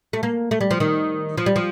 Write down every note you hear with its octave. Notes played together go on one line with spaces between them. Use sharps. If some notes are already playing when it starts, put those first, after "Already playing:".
A3
A#3
A3
G3
F3
D#3
F3
G3
F3